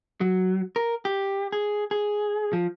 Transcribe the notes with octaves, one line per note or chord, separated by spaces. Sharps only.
F#3
A#4
G4
G#4
G#4
F3